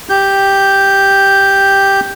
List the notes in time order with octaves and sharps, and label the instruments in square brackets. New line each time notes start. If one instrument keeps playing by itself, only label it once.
[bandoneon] G4 G6